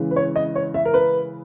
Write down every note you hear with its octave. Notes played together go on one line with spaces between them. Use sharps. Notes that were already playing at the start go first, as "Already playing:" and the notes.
Already playing: C#3 E3 G#3
B4
C#5
D#5
C#5
E5
A#4
B4